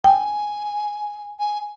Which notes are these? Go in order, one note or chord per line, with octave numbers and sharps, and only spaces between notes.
G5 G#5
G#5